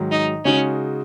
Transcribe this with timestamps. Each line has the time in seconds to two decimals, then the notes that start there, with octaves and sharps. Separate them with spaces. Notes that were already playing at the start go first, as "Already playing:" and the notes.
Already playing: G#2 D#3 F#3
0.12 D#4
0.45 C#3 G#3 C#4 D#4 F#4